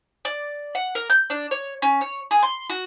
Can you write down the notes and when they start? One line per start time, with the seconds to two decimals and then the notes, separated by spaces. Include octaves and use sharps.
0.25 D5
0.75 F#5
0.95 A#4
1.10 G6
1.30 D4
1.51 C#5
1.82 C#4
2.01 C#5
2.31 G#4
2.43 C6
2.70 F#4